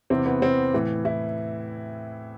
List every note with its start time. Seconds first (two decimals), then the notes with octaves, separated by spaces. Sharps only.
0.10 E2 C3 E3 C4
0.26 B3
0.42 C4
0.74 A2 E3
1.05 E4